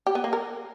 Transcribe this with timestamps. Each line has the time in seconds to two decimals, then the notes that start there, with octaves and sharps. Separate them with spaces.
0.06 G4
0.15 B3
0.24 A#3
0.33 A#4